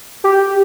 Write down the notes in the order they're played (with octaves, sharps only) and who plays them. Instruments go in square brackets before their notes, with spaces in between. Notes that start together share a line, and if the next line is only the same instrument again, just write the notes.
[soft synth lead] G4